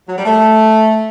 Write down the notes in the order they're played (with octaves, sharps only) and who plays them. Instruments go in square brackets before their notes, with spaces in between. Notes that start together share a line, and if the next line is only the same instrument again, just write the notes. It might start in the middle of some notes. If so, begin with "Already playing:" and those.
[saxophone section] F#3
G3
A3